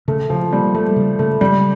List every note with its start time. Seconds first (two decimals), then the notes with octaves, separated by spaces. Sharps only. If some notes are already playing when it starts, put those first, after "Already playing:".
0.08 C#3 A3
0.30 C#3 F3
0.53 G3 A#3
0.74 G3 A3
0.96 C#3
1.19 C#3 A3
1.41 C#3 G3